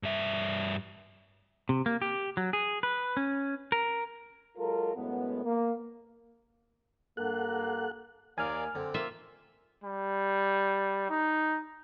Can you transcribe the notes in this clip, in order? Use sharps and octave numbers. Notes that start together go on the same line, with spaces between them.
G2 E5
C3
A#3
G4
F#3
G#4
B4
C#4
A#4
F#3 G#3 F4 A4 A#4
F#2 A2 G#3 B3
A#3
G2 A#3 A4 F#5 F#6
D#2 A#4 D5 F5 G#5 F6
D3 C4
A#3 F4 E5
G3
D#4